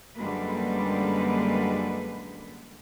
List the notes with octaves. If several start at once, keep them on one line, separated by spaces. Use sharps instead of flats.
F#2 D3 G3 G#3 A#3 B4